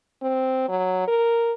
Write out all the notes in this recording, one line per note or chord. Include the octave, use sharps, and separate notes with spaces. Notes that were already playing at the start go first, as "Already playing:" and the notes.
C4
F#3
A#4